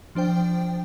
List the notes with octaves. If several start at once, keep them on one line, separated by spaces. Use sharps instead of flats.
F3 D4 C5 G5